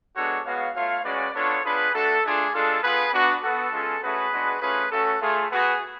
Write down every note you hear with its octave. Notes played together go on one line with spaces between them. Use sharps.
G#3 B3 D4 F#4 A4 C#5
G#3 B3 F#4 C#5 F5
A3 F4 C#5 F5
G#3 C#4 F#4 B4 D5
B3 D4 F4 A4 C#5
B3 D4 F4 G#4 B4
A3 D4 F#4 A4
A3 D4 F4 G#4
G#3 D4 F4 A4
B3 F4 G#4 B4
B3 D4 F#4
B3 F#4 A4
G#3 C#4 F4
A3 C#4 F#4 G#4 B4
G#3 B3 D4 F#4
A3 C#4 F4 G#4 B4
A3 C#4 F#4 A4
A3 F4 G#4
B3 F#4 G#4